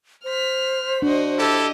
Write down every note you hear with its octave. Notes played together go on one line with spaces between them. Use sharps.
C5 F6 B6
D4 F#4 D#5
E4 G4 A4 D#5